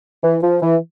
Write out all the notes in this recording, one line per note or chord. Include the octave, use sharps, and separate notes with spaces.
E3
F3
E3